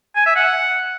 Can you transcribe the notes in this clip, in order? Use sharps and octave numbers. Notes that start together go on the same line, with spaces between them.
G#5
E5
F#5